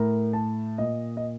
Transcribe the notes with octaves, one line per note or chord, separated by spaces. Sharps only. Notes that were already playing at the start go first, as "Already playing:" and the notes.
Already playing: A2 A#4
A5
A#2 D#5
D#5